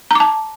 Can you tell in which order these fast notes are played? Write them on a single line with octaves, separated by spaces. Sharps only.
A#5 D6 A5